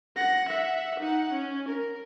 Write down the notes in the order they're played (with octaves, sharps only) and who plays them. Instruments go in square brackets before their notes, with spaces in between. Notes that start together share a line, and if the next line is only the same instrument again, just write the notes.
[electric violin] F#5 A#6
E5 F#5
D#4 F#5
C#4
A#4